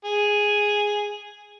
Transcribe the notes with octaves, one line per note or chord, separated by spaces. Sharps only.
G#4